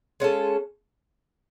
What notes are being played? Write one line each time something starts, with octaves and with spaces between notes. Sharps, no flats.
G#3 C#4 F4 A4